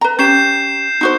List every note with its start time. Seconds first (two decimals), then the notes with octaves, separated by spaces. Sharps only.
0.01 B4 A#5
0.19 C#4 G4 G6 C7 E7
1.01 D#4 F#4 C5